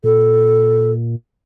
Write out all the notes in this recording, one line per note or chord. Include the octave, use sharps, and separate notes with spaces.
A#2 A4